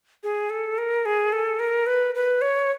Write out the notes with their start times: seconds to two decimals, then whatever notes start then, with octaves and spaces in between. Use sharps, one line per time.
0.23 G#4
0.50 A4
0.78 A#4
1.06 G#4
1.33 A4
1.60 A#4
1.87 B4
2.15 B4
2.41 C#5